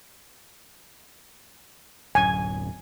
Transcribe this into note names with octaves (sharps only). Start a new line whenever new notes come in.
D1 F#2 G#5